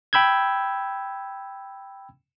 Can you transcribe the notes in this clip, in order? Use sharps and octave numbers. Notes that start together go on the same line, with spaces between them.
G5 B5 E6 G6 G#6